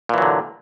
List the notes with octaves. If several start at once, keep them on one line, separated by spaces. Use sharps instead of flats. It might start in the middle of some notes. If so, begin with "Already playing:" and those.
A#2 D3 E3 F#3